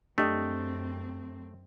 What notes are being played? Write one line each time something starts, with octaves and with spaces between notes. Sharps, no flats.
F#2 A3 C4 D4 G4 D#5